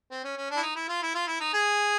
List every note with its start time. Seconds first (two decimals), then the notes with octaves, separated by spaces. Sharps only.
0.11 C4
0.24 C#4
0.37 C#4
0.51 D4
0.57 E4
0.63 D#4
0.76 E4
0.89 F4
1.02 E4
1.15 F4
1.27 E4
1.41 D#4
1.54 G#4